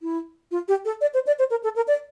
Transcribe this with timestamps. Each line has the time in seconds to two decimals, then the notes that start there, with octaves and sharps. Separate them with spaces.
0.02 E4
0.51 F4
0.68 G4
0.85 A4
1.01 D5
1.14 C5
1.27 D5
1.39 C5
1.51 A#4
1.64 A4
1.76 A#4
1.88 D5